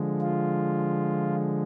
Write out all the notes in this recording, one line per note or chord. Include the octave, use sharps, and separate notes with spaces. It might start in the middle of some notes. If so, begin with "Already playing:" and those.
Already playing: D3 F3 G#3
F4